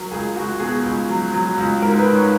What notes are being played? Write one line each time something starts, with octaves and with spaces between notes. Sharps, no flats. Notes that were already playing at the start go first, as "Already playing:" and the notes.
Already playing: F#3 A#4
C#2 G#4
C#2 F#4
B2 G#4
C#2
F#3
F#3
C#2
G#2 A#4
A#4
B4
G#2
C#5